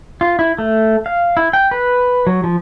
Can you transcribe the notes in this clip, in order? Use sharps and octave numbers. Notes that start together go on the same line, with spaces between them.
F4
E4
A3
F5
E4
G5
B4
F#3
F3